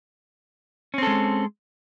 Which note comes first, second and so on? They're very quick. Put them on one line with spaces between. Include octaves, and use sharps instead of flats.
C#4 C4 A4 G#3